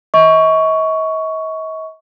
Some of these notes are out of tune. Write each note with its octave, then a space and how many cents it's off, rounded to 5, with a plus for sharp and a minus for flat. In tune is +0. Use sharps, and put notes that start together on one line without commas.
D#5 +45 C#6 +10